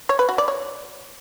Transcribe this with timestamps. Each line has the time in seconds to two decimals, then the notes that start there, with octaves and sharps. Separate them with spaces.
0.09 C#5
0.19 B4
0.29 F#4
0.38 D5
0.48 C#5